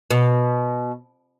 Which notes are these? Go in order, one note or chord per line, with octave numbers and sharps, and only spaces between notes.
B2